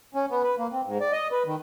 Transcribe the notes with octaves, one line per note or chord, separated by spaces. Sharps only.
C#4
B3
B4
A#3
C4
G#2
D5
D#5
B4
D#3